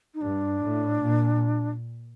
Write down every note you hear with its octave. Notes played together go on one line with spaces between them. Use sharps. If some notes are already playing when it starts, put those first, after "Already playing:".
D#4
G2 D4
A2
A#2